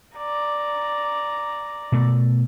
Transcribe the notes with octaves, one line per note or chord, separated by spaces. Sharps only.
D5 A#5
B2 A3